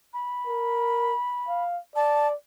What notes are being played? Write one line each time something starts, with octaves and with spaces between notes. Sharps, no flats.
B5
A#4
F5
D5 A5